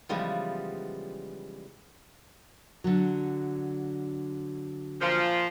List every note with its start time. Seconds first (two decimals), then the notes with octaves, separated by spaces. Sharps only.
0.09 C#3 E3 F3 G3 G#3 B3
2.84 D3 F#3
5.01 A#2 F3